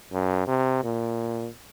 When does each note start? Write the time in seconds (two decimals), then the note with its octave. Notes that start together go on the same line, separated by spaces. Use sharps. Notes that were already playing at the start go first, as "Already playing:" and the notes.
0.12 F#2
0.47 C3
0.83 A#2